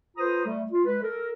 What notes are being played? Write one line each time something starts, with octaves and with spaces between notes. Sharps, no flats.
F4 A4 B4 C5 A#5 D#6
G3 A3
F4
G#3 B4
A4 A#4